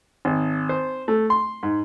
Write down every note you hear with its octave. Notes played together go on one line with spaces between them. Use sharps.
G#1
C5
A3
C6
G#2